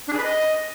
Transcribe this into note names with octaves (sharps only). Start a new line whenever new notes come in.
D4
G#4
B4
D#5